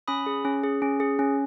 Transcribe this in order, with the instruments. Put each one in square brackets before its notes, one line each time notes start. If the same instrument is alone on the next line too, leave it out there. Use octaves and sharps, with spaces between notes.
[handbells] C#4 B5 D#6
G#4
C#4
G#4
C#4
G#4
C#4